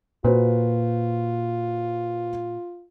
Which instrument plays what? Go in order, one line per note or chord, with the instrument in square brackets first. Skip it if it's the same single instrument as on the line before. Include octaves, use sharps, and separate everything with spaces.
[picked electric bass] A#2 [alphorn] F4 [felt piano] F#4 B4 C5